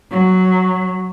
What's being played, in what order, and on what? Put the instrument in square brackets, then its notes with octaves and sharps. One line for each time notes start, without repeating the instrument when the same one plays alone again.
[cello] F#3